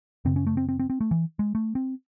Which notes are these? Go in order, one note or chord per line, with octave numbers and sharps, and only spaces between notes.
F#2 C#3 C4
C#4
A3
C4
C4
C4
C4
A3
E3
G#3
A3
C4